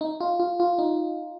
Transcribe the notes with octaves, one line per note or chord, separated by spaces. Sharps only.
D#4
F4
F4
F4
D#4